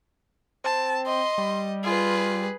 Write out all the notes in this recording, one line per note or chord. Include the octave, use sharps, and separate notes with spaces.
C4 A5
D#5 C6
G3
F4 G#4 B4